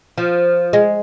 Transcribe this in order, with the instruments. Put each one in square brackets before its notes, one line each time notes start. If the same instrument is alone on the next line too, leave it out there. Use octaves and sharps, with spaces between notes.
[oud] F3
G#3